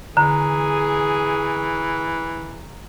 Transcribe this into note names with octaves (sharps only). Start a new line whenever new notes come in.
D3 E3 G#4 A#5